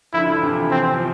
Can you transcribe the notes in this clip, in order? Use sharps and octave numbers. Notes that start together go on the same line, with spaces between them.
D3 F3 E4
D3 F3
C3 E3
C4
F3